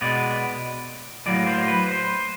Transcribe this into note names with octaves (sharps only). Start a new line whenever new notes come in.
B2 G#3 B3 D5
A2 F#3 A#3 D5
C5
B4
C5